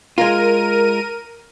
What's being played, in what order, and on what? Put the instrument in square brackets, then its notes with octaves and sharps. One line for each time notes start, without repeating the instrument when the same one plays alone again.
[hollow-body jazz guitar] G#3 F4 [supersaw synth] A#4 D#7